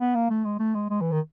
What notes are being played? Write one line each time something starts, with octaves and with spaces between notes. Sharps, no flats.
B3
A#3
A3
G#3
A3
G#3
G#3
E3
D#3